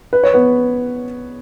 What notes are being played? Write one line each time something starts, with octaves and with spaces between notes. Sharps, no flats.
B4
C#5
B3 B4